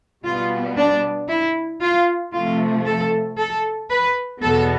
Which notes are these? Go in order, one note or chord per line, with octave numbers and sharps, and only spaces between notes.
B2 G3 B3 F4
D4
E4
F4
C3 F3 A3 F4
A4
A4
B4
E2 B2 B3 A4